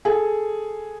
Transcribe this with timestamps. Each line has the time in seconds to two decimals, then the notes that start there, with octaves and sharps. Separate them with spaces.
0.05 G#4 A4